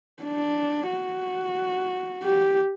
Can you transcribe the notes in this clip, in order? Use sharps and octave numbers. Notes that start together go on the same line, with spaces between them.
D4
F#4
G4